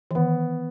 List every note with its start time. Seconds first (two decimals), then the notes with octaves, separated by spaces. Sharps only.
0.11 E3
0.15 D#3 B3